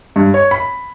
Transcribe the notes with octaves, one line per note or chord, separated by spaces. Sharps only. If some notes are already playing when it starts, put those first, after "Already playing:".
G2
C#5
B5